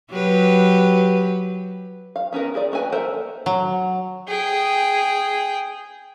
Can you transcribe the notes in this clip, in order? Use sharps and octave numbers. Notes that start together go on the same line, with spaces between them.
F#3 G4 B4
F5
B3 C#4 D#4 A#4
E4 G#4 B4 D5
A#3 F#4 B4 G#5
A4 A#4 C5 E5 F#5
F#3
G#4 G5